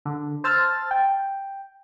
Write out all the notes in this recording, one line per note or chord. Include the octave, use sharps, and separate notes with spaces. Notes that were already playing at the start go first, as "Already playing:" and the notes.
D3
C5 A5 E6 F6 A6
G5